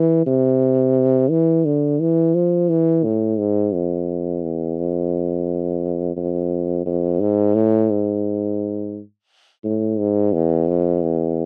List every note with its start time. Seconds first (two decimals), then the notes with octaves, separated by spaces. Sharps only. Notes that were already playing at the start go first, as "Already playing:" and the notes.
Already playing: E3
0.26 C3
1.30 E3
1.65 D3
2.00 E3
2.35 F3
2.69 E3
3.04 A2
3.38 G#2
3.73 F2
4.43 E2
4.78 F2
6.16 F2
6.85 F2
7.20 G#2
7.54 A2
7.90 G#2
9.64 A2
9.98 G#2
10.33 E2
10.67 F2
11.02 E2